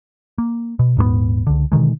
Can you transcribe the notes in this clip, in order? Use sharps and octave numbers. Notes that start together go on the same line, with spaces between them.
A#3
B2
D#1 G#2 G#3 B3
C#2 D3
B2 D3 D#3 G#3